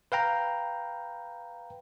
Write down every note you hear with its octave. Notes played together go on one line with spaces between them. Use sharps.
B4 F5 G5 A#5